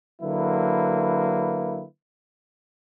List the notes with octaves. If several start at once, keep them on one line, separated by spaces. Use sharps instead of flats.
D3 F#3 A#3 E4 B4